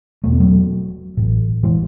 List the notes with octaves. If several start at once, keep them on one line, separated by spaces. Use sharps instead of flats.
E1 E2 B2 A3
B3
F#3 A3
A1 A2
E3 G#3